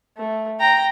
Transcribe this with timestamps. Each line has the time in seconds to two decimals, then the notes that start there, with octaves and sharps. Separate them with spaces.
0.17 A3
0.60 G5 A#5